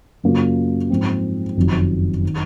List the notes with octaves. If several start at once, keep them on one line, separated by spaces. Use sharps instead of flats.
F#2 C#3 F#3 A#3 F4
G#2 F3 C4
F#1 F2 D#3 F#3
D#3